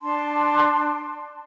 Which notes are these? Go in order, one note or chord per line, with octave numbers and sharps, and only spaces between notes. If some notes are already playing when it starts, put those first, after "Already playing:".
D4 A5 C6